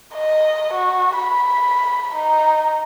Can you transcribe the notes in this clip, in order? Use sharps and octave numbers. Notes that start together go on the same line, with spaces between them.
D#5
F#4
B5
D#4